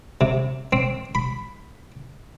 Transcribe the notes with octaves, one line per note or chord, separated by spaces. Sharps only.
C3
C4
B5